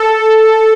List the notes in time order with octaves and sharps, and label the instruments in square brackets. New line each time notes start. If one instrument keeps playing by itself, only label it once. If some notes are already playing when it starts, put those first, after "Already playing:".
Already playing: [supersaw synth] A4